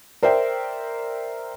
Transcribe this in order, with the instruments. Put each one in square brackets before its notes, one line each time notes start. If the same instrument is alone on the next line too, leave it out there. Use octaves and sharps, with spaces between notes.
[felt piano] A#4 C5 D5 E5 G5